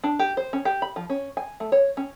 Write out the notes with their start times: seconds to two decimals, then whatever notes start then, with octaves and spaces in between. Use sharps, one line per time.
0.04 D4
0.19 G4
0.37 C5
0.53 C#4
0.65 G4
0.82 B5
0.96 F3
1.10 C#4
1.37 G#5
1.60 A3
1.72 C#5
1.97 C#4